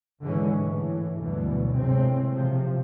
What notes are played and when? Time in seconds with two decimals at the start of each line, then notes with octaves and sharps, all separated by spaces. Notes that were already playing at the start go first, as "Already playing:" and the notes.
0.22 G#2 D3 E3 G#3 C#4
0.57 A2 E3
1.17 D2 G2 B2 D3 E3 F#3
1.73 A2 C3 G#3 C4
2.32 C3 F3